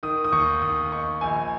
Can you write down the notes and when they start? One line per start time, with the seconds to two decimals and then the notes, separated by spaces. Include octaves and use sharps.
0.03 D#3 D#6
0.24 D#6
0.32 D#2 C#6
0.62 D#2 D#6
0.92 D#4 C#6
1.21 A#1 G#5